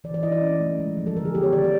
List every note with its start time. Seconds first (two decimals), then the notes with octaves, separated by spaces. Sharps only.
0.04 E3 D5
0.14 D5
0.23 E4 D#5
0.32 D5
0.42 C#4
0.60 A3
0.79 G#3
0.97 F3
1.06 A4
1.16 D3 A#4
1.25 G#4
1.35 B3 G4
1.43 C#5
1.53 D#3 D5
1.64 D5